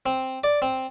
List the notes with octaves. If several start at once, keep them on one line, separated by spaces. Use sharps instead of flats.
C4
D5
C4